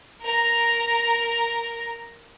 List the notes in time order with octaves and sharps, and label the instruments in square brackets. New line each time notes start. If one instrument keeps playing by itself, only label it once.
[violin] A#4 A#5